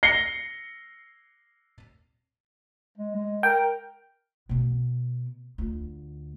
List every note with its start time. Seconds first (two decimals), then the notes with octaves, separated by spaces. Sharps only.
0.03 A#6 C7 C#7 G7
2.98 G#3
3.15 G#3
3.43 A#4 G5
4.49 B2 B3
5.58 D2 F4